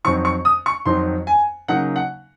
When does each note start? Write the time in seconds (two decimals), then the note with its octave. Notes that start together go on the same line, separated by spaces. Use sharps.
0.04 F2 D#3 F#3 C4 D#4 C#6
0.25 C#6
0.45 D#6
0.66 C#6
0.86 F2 D#3 F#3 C4 D#4 C6
1.27 G#5
1.68 C#3 F#3 A#3 D#4 F#5
1.96 F#5